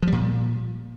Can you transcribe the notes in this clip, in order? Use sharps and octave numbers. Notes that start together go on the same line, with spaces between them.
A#2 F3 G3